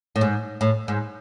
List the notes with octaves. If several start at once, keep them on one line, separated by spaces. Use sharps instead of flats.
A2
G#2
A2
G#2